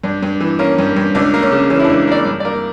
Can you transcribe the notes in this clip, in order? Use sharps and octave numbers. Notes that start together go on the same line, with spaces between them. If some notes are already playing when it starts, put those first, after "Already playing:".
G2 D4
G2
E3
A#3 C#4
G2
G2
C#2 D4
A#3
C#4
C#3
E3 C#4
E4
D4
C#2
A#3 D5
G2
A#3 D5